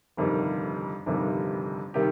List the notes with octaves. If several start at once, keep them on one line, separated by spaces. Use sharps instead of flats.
G1 F2 C3 D#3 G3
G1 F2 C3 D#3 G3
C3 D#3 G3 G4